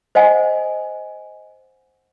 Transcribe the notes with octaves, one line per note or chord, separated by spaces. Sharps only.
C5 D#5 F#5 G#5